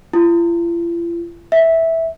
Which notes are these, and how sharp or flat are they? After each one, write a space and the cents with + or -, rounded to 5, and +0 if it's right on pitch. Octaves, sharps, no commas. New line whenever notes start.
F4 -45
E5 -10